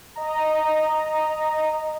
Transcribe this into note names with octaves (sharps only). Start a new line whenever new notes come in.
D#5 A#5